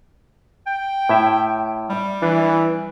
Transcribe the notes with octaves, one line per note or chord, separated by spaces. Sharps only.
G5
A2 E4 E5
G3
E3 D4